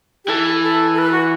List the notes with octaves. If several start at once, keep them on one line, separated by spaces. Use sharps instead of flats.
G4
E3 A4
A4
A4
B4
F#4